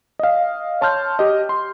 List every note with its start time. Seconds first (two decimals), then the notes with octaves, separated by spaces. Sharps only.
0.19 D#5 F5
0.81 C#5 A5 C6 F6 G6
1.19 G4 D#5
1.49 C6